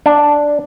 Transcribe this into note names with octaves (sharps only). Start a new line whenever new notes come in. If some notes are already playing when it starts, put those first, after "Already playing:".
D4